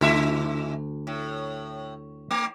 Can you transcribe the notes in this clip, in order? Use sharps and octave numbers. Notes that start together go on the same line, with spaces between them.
D2 C#3 E4 E5
A2
A3